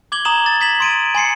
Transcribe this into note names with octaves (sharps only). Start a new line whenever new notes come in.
D6 G#6 F#7 G7
A#5 D#6 E7 F#7
A6
D#6 G#6 B6 E7 F#7
C6 D7 D#7
G#5 C6 C7 C#7